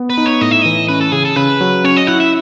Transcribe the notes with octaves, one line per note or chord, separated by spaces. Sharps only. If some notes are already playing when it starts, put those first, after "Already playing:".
Already playing: B3
B4
D#4
C#5
A2 D#5
E5
E3 D#5
C#4 B4
A4
C#3 G#4
A4
C#3 B4
F#3
C#4 C#5
D#5
E4 F#5
E5